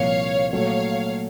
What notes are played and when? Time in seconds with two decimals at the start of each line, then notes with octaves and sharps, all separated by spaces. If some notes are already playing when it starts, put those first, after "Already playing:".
Already playing: C2 A#2 F3 A#3 C#5 F5
0.53 A#2 F#3 A3 C#5 F5